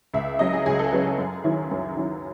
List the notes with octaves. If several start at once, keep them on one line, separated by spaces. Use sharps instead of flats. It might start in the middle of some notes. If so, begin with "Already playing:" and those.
C#2 E5
C#3 F#3 C#4 D#5
G#4
C#2 G#4
A4
C#3 F#3 C#4 B4
G#4
F#2
D#3 F#3 C#4 E4
F#2
D#3 F#3 C#4 E4